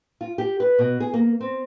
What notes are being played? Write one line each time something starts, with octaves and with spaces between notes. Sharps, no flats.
F4
G4
B4
B2
G#4
A#3
C4